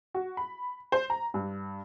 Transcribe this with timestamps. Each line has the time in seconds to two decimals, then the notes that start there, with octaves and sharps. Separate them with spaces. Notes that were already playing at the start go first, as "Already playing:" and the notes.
0.14 F#4
0.37 B5
0.92 C5
1.10 A#5
1.34 G2